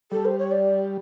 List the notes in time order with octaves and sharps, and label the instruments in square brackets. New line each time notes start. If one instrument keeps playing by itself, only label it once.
[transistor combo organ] G3 [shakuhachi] A4
[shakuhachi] C5
C#5
D5